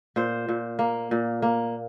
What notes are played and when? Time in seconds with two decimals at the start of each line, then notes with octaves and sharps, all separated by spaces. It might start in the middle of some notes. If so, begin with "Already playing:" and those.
0.16 A#2 C5
0.49 A#2
0.79 A#3
1.11 A#2
1.42 A#3